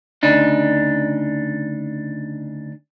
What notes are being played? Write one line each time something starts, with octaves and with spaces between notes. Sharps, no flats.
D2 C#3 D4 D#4